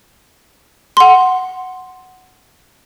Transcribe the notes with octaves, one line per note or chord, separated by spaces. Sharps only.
F#5 C6